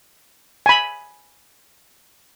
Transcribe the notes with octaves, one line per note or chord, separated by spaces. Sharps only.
G#5 B5